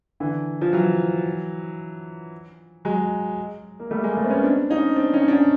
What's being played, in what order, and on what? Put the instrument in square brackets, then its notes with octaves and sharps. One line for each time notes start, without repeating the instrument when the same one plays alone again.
[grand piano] D3 E3
F3
E3 F#3
F#3 G#3
A#3
G3 A3
G#3 A#3
A3 B3
C4
B3 C#4
C4 D4
C#4 D#4
C4 D4
C#4 D#4
D4
C#4 D#4